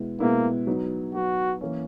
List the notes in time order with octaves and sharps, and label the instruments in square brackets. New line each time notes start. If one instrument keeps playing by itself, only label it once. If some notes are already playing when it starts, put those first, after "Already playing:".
Already playing: [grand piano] B2 G#3 B3 E4
[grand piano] B2 G#3 B3 E4 [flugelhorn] A#3
[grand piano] F#3 B3 D#4
[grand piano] F#3 B3 D#4 [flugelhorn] F#4
[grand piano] E3 A#3 C#4